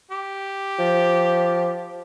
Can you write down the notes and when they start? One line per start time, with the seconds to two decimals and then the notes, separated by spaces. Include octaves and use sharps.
0.10 G4
0.79 F3